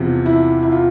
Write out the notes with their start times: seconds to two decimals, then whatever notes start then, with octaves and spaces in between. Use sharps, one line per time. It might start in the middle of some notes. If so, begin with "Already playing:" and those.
Already playing: E2 C3 F3
0.26 E4
0.63 E4
0.72 F4